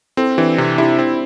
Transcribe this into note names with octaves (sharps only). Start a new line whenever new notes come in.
C4 E4 A4
E3 D4 G4
C3 C4 E4
D4 E4 G4
C4